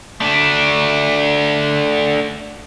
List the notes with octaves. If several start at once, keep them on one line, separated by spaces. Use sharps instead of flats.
A3 D4